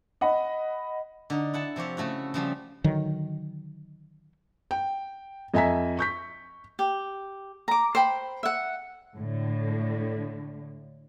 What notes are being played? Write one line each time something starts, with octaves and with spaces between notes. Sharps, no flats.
D#5 F#5 B5
D3 D#4
E4 F#5 A5
C3 F3 G4 C#5
C#3 A3 E4 F#4
C#3 F3 G3 C#4
D3 D#3 F#3
G5
F2 D#5 E5 G#5 A#5 B6
C#6 G6 B6
G4
A#5 D6
C5 G5 B5
E5 F#5
A2 D3